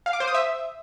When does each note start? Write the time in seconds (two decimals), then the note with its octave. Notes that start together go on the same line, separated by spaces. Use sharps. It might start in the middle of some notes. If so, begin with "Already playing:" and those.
0.06 F5
0.13 D6
0.20 C5
0.27 D#6
0.35 E5